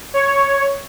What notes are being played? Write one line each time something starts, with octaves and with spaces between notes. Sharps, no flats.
C#5